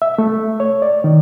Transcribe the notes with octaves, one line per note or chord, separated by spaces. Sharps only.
E5
A3
C#5
D5
D#3